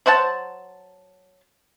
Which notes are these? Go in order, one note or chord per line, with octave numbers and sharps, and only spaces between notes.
F#3 C5 F#5 A5